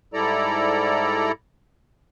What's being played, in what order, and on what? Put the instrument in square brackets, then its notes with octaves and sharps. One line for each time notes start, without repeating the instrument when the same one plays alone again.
[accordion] G#2 G3 E4 A4 D5 A#5